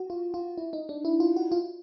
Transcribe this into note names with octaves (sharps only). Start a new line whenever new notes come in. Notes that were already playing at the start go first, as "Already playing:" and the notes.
Already playing: F#4
F4
F4
E4
D#4
D4
E4
F4
F#4
F4